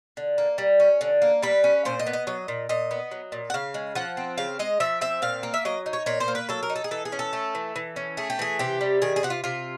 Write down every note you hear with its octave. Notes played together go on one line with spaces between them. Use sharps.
D3
A#3
G3
C#4
D3
A#3
G3 B4
C#4
A#2 C5
D#5
B3
D#5
F#3 D#5
A#2
A#2 D#5
B3
F#3
A#2
F#5
C#3 F5
G#3
F3 F#5
C4
C#3 F5
G#3 D#5
F3 E5
C4 E5
A#2 F5
A#3
E5
F#3 D#5
D#4
C#5
A#2 C#5
C5
A#3
B4
F#3 A4
A#4
D#4
A4
G#4
E3 A4
G#4
C#4
A4
A3
E3
E3
C#4
A3 G#4
G4
E3 G#4
C3 G4
G3
D#3 G#4
G#4
C3 F#4
F4
C3 F4